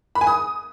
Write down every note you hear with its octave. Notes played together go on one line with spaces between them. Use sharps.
B5
G#5
D#6